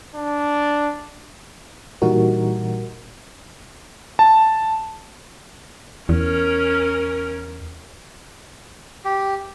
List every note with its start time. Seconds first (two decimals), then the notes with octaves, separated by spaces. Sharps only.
0.15 D4
2.02 A#2 E3 G3 D#4 F#4 A#4
4.19 A5
6.09 E2 C#4 A#4
9.05 G4